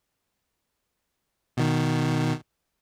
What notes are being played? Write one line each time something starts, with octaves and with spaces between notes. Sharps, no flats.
B2 D#3